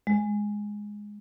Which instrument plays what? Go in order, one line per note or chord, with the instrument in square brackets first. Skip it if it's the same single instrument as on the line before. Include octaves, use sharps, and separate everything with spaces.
[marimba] G#3